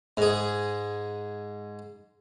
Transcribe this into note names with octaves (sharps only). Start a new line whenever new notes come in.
G#2 G#4